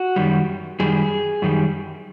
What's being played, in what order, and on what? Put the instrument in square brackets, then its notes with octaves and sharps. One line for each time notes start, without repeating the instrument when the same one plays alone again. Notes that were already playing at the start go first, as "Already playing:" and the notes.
Already playing: [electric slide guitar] F#4
F#2 D#3 G3
F#2 D#3 G3 G#4
F#2 D#3 G3